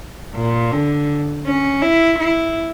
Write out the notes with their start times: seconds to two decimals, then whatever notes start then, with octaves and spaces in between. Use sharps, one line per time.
0.36 A#2
0.72 D3
1.46 C#4
1.82 E4
2.19 E4